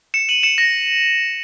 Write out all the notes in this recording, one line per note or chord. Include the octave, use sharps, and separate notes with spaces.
C#7 E7
D#7 F#7
C#7 E7
A#6